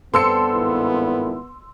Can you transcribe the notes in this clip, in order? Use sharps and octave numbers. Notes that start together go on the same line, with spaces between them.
G2 B3 C4 A4 C6 E6 C#7
G#1 A#2 E4